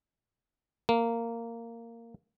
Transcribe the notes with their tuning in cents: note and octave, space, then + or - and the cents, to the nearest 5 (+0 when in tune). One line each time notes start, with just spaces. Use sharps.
A#3 -15